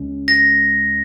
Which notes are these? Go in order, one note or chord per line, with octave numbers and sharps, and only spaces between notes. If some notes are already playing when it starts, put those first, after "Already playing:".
Already playing: C#2 C#3 G#3 C#4
A#6